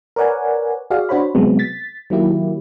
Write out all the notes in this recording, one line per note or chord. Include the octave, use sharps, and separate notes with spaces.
A#4 B4 C#5 D5 F#5 G#5
F#4 G#4 D5 F5
D4 F#4 C5 C#5 B5
C3 F#3 G#3 B3 C4
A6 B6
D#3 F#3 A#3 E4 G4